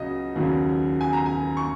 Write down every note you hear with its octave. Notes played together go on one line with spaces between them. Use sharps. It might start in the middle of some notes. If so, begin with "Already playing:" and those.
Already playing: C#2 C#3 F#3 D#5
D#2 C#3 F#3
G#5
A#5
G#5
C#6